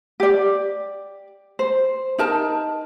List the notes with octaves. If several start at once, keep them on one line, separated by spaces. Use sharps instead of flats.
G4 D5
C5
D#4 A#4 A5